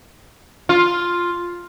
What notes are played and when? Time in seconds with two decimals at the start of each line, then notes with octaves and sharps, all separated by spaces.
0.69 F4